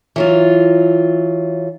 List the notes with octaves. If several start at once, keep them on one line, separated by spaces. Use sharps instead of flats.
E3 F#3 F4